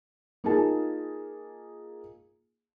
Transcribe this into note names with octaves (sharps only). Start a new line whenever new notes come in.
A#3 D#4 F4 G#4 A5